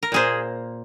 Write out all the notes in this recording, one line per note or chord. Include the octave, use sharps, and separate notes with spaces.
A#4
A#2 A#3 G#4 C5